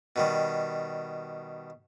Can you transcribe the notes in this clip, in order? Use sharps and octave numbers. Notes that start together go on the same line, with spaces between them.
B2 D#3 G3